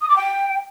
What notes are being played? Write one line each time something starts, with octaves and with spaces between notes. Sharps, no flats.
D#6
D6
G5